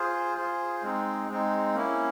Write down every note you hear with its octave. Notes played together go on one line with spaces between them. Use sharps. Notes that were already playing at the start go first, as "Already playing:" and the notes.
Already playing: F4 G#4 C5
F4 G#4 C5
G#3 C4 D#4
G#3 C4 D#4
A#3 C#4 E4